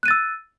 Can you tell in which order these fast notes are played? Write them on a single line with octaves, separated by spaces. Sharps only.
F#6 D#7 A6 E6